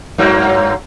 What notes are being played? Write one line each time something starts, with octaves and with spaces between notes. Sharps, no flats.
G2 F#3 A#3